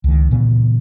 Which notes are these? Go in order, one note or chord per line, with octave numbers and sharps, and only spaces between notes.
C#2 D#3
A#2 C#3 E3 B3